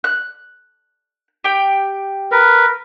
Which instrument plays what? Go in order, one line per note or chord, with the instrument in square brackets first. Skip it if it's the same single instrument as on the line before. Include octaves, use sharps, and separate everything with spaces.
[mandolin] F#6
G4 G5
[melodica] A#4 B4